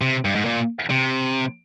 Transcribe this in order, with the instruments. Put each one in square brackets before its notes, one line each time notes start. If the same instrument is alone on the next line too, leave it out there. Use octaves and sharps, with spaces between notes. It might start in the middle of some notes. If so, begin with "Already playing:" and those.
[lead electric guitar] C3
G2
G#2
A#2
C3